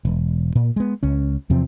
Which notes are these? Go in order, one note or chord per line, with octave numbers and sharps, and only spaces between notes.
E1
A#2
G#3 B3
C#2 C#4
E2 C3 F3 C4